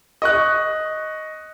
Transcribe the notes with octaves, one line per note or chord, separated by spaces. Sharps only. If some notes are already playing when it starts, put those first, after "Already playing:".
D#5 C#6 F#6